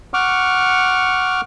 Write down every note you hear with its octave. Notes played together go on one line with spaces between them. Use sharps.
F#5 C#6 D6 F6